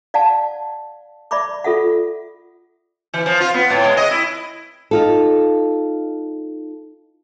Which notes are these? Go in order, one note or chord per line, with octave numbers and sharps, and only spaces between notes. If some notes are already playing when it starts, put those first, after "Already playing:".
D5 F5 F#5 A5
D5 E5 B5 C#6 D6
F4 A4 E5 F#5
E3
F3
F4
B3
A2
G#3
D#5
E4
D#4 F4 A4